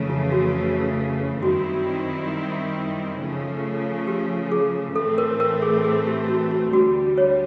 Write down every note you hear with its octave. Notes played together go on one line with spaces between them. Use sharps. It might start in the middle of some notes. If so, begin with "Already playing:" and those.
Already playing: F2 C#3 E3 A3
F4
F#4
F#2 D#3 G3 C4 E4 F#4
C#3 F3 A3
G4
G#4
A2 E3 A3 C4 A4
A#4
A#4
G#4
G#4
G4
F#4
F#4
D2 D3 G3 F#4
C#5